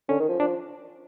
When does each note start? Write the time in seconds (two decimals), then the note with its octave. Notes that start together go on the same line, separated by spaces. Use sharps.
0.09 D3 C#4
0.19 D#3
0.29 F3
0.40 F3 D4